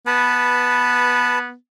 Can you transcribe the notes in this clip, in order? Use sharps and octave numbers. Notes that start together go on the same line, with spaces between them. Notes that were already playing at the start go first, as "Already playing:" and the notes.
B3 B4 A5